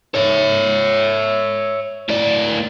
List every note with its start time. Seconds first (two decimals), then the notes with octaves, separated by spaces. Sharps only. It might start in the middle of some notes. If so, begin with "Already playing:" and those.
0.15 C#5 E5
2.09 A2 D5